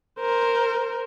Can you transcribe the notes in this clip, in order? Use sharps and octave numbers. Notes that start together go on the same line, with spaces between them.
A#4 C5